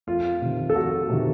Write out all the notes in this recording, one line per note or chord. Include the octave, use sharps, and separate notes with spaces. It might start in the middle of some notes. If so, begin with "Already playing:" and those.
F2 F4
C3 D#3
A4
F2 F#4
C3 D#3